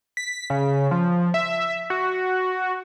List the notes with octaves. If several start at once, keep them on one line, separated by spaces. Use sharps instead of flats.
B6
C#3
F3
E5
F#4